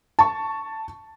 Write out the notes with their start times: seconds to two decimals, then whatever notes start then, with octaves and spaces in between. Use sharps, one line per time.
0.19 A5 C#6